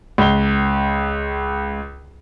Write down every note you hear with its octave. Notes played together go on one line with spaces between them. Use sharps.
C#2 G7